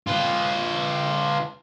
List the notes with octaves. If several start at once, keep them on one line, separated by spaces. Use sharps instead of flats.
F4 B4